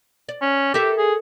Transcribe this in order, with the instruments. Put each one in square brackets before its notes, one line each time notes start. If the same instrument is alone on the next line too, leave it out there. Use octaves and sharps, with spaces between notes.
[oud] D5
[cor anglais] C#4
[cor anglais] G4 [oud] A4 A#4 E5
[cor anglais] G#4